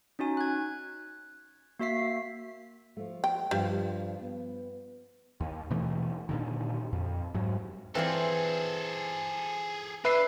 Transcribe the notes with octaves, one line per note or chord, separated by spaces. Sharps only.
C#4 D#4 F#4 G#5
F#6 G#6
A#3 F#4 E5 B6 C7
F3 A3
G5
G2 F3 G3 F4
B3
D#2
B2 E3 A3
A#2 D3 D#3
F2
G#2 F#3
E3 C4 F4 G#4 A4 D5
D4 B4 E5 C7